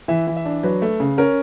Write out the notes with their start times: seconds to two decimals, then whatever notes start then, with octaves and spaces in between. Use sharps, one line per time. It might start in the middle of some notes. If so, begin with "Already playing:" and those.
0.08 E3 E5
0.27 E3
0.37 E5
0.45 D4
0.63 F#3 B4
0.82 A3
1.00 C#3
1.18 C#4 A#4